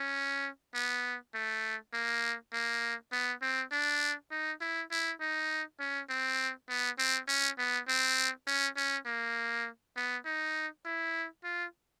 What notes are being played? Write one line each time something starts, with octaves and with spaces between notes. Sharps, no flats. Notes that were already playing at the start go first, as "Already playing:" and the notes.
Already playing: C#4
B3
A3
A#3
A#3
B3
C4
D4
D#4
E4
E4
D#4
C#4
C4
B3
C4
C#4
B3
C4
C#4
C#4
A#3
B3
D#4
E4
F4